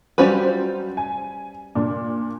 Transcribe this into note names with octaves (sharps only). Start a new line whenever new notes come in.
F#3 G3 C#4 F4 B4 C5
G#5
A#2 D4